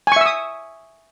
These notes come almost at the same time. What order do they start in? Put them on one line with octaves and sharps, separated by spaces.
G#5 C#6 E5 E6 D#6